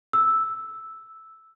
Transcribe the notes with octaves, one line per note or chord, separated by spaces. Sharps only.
E6